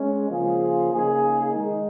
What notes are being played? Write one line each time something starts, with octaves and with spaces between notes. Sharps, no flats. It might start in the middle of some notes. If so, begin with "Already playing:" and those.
Already playing: G#3 C#4
C#3 F3 A#3 F4 G#4
C#3 A#3 D#4 G#4
D#3 G#3 D#4